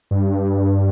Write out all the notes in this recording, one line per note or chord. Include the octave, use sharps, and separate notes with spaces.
G2